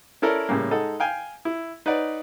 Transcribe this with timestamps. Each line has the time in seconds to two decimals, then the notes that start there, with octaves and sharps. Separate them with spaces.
0.22 C#4 E4 A4 A#4 D5
0.49 A2 C#3 G3 A#3
0.71 G#3 D#4 A4 F#5
1.00 F5 G5 G#5
1.45 E4
1.86 D#4 B4 C#5 D5 F#5